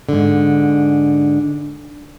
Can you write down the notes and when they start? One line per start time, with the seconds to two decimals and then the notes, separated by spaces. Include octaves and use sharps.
0.09 G#2 D3